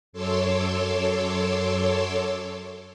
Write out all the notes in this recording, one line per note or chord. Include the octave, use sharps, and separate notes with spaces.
F#2 A4 C#5 C6 D6 E6